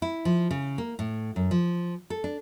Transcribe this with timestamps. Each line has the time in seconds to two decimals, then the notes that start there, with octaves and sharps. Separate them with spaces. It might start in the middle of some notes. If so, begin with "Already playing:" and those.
0.02 E4
0.25 F3
0.51 C#3
0.78 A#3
0.99 A2
1.36 F#2
1.51 F3
2.10 A4
2.24 D4